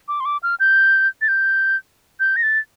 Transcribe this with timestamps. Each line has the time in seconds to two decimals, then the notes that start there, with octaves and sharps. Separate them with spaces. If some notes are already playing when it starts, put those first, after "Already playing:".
0.08 D6
0.20 C6
0.25 D6
0.43 F6
0.60 G6
1.22 A6
1.28 G6
2.20 G6
2.36 A#6
2.43 A6